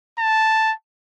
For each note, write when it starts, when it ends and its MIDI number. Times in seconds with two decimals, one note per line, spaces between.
0.19 0.73 81